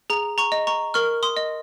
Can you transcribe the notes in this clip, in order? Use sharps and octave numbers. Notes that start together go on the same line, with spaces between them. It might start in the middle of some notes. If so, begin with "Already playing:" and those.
G#4 A#5
A#5 C#6
D#5
A#5 C#6
A#4 C#6 F6
C6 D#6
D#5